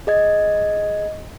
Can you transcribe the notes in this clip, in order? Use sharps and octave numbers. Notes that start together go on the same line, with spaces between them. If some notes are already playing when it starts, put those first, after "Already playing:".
G#4 D#5 G#6